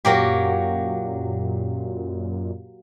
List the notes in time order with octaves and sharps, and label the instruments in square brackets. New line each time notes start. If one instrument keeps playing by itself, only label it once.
[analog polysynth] F#2 A#2 [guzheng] F#3 A#3 G4